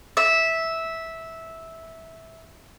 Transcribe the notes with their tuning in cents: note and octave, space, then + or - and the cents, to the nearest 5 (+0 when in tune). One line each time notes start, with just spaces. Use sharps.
E5 -10